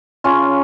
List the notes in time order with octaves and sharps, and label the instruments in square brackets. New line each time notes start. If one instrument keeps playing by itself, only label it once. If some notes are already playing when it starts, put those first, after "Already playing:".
[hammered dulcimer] C#3 C#4 F4